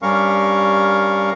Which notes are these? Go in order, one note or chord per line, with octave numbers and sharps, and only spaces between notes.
G2 G3 C#4 A#4 F5 C#6